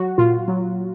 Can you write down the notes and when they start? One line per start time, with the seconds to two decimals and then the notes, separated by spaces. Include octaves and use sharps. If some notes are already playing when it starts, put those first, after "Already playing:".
Already playing: F#3 F#4
0.18 A#2 F4
0.48 F#3